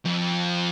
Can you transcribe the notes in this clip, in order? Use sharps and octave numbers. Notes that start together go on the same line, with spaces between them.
F2